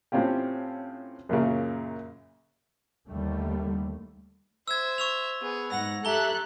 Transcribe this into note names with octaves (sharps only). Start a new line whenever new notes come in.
A2 C4 C#4 F4 G4
F#2 A#2 C#3
D#2 D3 G3 A3
C5 E5 E6 G#6
C#6 E6 F7
B3 G#4
G#2 F#5 A#6
G4 A4 E5 A#5 F#6 G7